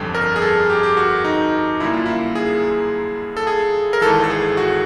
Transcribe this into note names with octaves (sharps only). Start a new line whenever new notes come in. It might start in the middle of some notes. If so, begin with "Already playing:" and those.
Already playing: G1 F2 D3 G3 A4
A#4
G#4
A4
G4
G4
F#4
D#4
F#2 D3 G3 A#3 E4
F4
E4
G#4
A4
G#4
A#4
G#1 G#2 E3 A4
A4
G#4
F#4